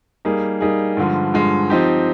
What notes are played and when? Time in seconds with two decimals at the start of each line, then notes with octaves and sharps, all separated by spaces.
0.25 G3 A#3 D#4 G#4
0.61 G3 A#3 D#4 G#4
0.97 G2 D3 F3 G#3
1.34 G2 D3 F3 G#3
1.70 F3 C4 D#4 G4